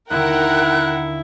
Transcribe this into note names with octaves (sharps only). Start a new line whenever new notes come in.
D#2 D3 E4 A#4 F#5 G5 F#6